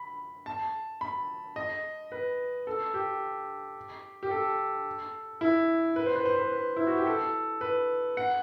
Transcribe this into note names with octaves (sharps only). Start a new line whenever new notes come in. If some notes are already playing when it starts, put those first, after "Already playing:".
Already playing: B5
A5
B5
D#5
B4
A4
G4
G4
A4
E4
B4
C5
B4
C5
B4
B4
E4
F#4
G4
A4
B4
F#5